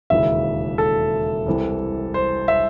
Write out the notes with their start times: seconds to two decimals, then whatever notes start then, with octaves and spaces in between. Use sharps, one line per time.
0.10 E1 D#2 C#3 E3 E5
0.78 A4
1.46 C2 C3 E3
2.14 C5
2.48 E5